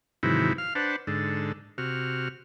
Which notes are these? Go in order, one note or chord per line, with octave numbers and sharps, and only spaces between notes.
G#2 C3 D#3 E3 F#3 E4
F5 F6
D4 B4 C5 F#5 A5
G#2 D3 A4
C3 F#4 F6